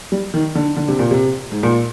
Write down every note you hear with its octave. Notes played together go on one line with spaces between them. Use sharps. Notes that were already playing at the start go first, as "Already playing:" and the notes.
G3
D#3
D3
D3
C3
A#2
C3
G#2
A#2